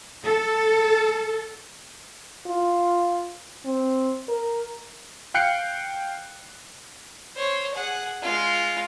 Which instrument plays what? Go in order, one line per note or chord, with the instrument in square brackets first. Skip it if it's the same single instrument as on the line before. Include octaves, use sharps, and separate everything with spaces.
[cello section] A4
[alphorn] F4
C4
A#4
[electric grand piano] F5 G5 F#6 C7 C#7
[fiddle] C5 C#5
G#4 F#5
G#3 F4